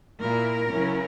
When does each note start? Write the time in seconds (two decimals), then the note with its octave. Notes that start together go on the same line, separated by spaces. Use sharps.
0.21 A#2 A#3 E4 A#4
0.72 C#3 F#3 C#4 E4